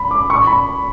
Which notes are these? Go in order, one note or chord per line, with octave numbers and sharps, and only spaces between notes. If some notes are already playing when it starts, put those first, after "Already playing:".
Already playing: B5
D6
C#6
B5